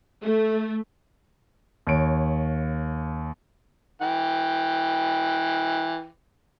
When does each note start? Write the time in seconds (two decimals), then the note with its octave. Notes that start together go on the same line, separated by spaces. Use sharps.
0.22 A3
1.87 D#2 C#5 D7
4.02 E3 G5